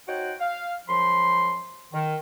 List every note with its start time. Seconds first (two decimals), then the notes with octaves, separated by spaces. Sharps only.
0.07 D#4 F#4 C5 C#5 F#5 G5
0.40 F5
0.88 F#2 F3 B5 C6
1.93 D#3